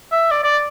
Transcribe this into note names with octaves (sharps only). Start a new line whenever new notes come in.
E5
D5
D5